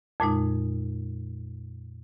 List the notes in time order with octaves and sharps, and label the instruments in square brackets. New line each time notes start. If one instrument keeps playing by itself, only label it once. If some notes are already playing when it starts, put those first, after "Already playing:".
[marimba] F2 A#2 G#3 D#4